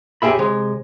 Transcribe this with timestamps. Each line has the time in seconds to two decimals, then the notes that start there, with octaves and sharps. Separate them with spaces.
0.22 B1 F#2 G4 G#4 E5 B5
0.39 C3 G#3